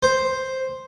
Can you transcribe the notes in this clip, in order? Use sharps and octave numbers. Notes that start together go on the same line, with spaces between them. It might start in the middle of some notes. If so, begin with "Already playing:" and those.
C5